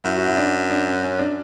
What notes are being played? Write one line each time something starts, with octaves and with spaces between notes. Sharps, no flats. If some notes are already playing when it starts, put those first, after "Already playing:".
F#2 E4
F#4
E4
D4
D4
C#4
C#4
D4